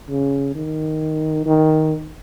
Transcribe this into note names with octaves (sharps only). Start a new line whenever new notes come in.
C#3
D#3
D#3